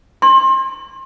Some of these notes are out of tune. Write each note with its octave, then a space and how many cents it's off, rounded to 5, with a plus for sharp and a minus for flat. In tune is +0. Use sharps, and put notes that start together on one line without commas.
C6 +30